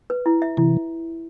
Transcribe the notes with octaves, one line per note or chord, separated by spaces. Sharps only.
B4
E4
E5
C3 E3 E4